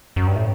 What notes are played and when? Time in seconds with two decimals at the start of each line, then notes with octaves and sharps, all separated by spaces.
0.16 F#2
0.27 G2
0.36 A2